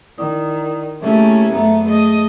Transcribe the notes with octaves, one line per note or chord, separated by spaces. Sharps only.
D#3 E4 D5 D#6
C#3 A3 A#3 C#4 E4 G4 E5
F#1 A3 B3 A4 E5 A#5
A3 G#4 D#5